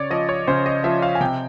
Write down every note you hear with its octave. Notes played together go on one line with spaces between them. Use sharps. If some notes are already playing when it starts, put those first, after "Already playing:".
Already playing: C#3 C#5 D5
F3 D#5
C#5
C#3 C5
D#5
F3 E5
F5
G#5
C3 G5